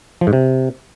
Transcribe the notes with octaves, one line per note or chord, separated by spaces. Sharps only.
F3
G#2
C3